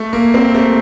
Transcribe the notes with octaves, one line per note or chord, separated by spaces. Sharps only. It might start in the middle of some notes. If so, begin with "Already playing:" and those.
Already playing: A3
A#3
C4
A3